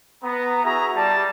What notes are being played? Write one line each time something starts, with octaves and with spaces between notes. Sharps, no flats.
B3 A#5
E4 F#4 G#4 A#5
G3 A5